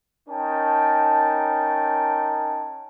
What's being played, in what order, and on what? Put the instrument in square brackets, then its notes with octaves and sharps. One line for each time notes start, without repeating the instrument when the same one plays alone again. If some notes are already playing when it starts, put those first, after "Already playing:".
[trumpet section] C#4 D#4 A#4 G5 A5